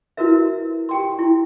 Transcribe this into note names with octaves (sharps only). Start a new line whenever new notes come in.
E4 F#4 A#4 B4 E5
G4 G5 C6
E4